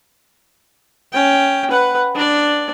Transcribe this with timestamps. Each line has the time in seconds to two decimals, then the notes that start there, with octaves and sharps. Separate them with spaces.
1.13 C#4 G5
1.70 B4 F#5
2.15 D4 D5